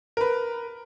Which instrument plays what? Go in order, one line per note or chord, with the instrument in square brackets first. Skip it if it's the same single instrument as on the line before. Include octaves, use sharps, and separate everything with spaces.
[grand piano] A#4 B4